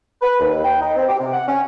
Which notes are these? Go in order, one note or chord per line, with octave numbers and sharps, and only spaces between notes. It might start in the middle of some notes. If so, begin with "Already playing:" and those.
B4
D#2
G5
D#4
C4
G4
C3
F#5
C#4